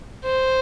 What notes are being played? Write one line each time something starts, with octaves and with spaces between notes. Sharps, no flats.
C5